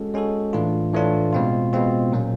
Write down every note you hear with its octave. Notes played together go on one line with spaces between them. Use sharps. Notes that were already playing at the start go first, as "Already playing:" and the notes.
Already playing: G#3 C#4 F#4 A4
G#3 C#4 F#4 A4
A2 E3 A3 D4 F4
A2 E3 A3 D4 F4
B2 G#3 C4 F4
B2 G#3 C4 F4
A#2 F#3 A#3 C#4